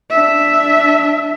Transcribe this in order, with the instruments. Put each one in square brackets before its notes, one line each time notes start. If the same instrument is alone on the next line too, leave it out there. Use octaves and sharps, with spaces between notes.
[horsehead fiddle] D4 E5